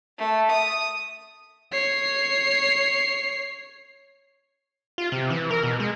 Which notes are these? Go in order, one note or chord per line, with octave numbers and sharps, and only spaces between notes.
A3
D#6
C#5 C7
F4
C3
E3
A#4
B2
G#3